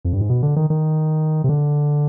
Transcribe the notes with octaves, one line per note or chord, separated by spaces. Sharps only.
F2
G2
G#2
B2
D3
D#3
D#3
C3
D3